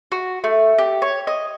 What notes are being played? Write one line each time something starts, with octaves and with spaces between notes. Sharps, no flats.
F#4
A3
G4
C#5
D#5